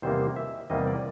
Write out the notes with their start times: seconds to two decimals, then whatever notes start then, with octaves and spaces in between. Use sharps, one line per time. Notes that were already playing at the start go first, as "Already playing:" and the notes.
0.02 E2 C3 D#3 G3 A#3 C5
0.36 E5
0.70 E2 C3 D#3 G3 A#3 D#5
0.87 D5